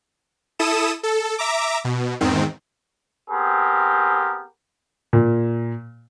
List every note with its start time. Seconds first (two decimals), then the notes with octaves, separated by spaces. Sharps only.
0.59 E4 A4 D#6 E7
1.03 A4
1.38 E5 A#5 D6
1.85 B2
2.21 E2 G#2 D#3 C4
3.30 B3 C4 G4 G#4 A#4
5.13 A#2